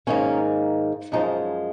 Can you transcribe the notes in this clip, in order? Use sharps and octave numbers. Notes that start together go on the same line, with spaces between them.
G#2 D#3 A#3 C#4
F#2 F3 G#3 D#4